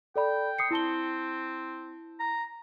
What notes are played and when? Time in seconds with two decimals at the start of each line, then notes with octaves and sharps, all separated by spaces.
0.16 A4 D5 G5 B5
0.58 D#6 C7 C#7
0.71 C4 E4 A5 G7
2.20 A#5